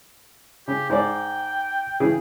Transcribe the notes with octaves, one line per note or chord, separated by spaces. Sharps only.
C#3 G4
G#2 C5 D5 G5
C#3 E3 G#4